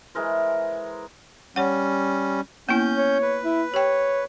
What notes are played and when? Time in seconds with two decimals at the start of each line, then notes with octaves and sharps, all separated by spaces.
0.15 E3 G#3 A#4 C5
1.56 G3 C#4 C#5 F#5
2.69 A#3 B3 C#4 E4 G6
2.97 C#5
3.22 B4
3.44 E4
3.74 G4 C#5 G5